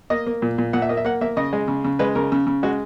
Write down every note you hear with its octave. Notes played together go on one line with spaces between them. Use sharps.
A#3 D#5
A#3
A#2
A#2
A#2 F#5
E5
A#3 D#5
E5
A#3 F#5
A#3 E5
C#3 D#5
G#3
C#3
C#3
G#3 B4
C#3 A#4
C#3
C#3
G#3 F#4